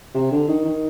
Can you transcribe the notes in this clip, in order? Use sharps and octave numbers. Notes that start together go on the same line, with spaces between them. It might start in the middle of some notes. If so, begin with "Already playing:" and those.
C3
D3
D#3
D#3